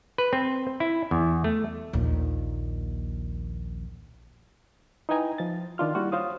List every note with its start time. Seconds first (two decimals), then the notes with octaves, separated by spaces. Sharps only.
0.18 B4
0.33 C4
0.80 E4
1.11 E2
1.44 A3
1.93 A#1 D#2
5.09 D#4 E4 B4 G5 G#5 A#5
5.38 F3 A6
5.78 D#3 D4 F4 F6
5.95 G3 A#3 E4 F#4
6.12 F4 F#4 C5 C#5 F5 D#6